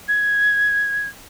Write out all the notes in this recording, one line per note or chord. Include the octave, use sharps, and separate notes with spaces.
G#6